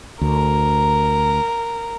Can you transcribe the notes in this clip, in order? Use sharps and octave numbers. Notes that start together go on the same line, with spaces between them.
D2 A#4